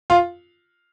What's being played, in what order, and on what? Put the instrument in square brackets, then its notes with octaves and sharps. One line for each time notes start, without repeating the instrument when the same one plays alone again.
[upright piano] F4